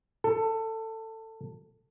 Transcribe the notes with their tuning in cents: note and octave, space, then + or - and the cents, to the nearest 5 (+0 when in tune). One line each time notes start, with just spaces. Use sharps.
A4 +20